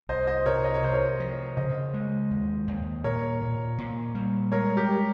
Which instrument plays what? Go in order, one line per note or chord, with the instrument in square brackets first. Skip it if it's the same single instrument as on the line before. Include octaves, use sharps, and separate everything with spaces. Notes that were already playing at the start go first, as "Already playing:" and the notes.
[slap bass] C2 [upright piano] C5 D#5
[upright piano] C5 D#5
[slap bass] C3 [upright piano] A#4 C#5
[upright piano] D#5
C#5
[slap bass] C3 [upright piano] C5
[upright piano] A#4 C#5
[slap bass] F3
[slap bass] C#3 [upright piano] C5 D#5
[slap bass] G#3
D#2
D#2
[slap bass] A#2 [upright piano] A#4 C#5
[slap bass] A#2
A#2
G3
[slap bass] G#3 [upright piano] A#4 C#5
[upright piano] G4 A#4